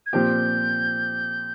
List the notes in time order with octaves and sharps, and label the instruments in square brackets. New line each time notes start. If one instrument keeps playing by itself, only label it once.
[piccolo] G#6
[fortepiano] A#2 F3 C4 G4 [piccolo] G6